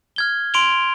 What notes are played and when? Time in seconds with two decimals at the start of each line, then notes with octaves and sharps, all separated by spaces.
0.16 F6 G#6 G7
0.54 C6 D7 F7 G7